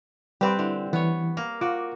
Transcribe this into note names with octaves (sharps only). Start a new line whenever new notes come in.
G3 C4 G4 B4
D3 E4
E3 B3 C#5
A#3
F4 F#4 D6